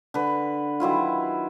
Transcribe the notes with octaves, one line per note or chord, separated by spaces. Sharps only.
D3 B4
D#3 F#3 E4 F4